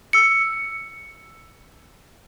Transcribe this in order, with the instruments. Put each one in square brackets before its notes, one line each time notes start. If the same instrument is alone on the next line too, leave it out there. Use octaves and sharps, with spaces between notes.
[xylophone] E6 C#7